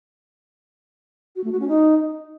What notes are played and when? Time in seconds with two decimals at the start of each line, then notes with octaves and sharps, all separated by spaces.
1.36 F#4
1.44 A3
1.52 F#4
1.60 C#4
1.68 D#4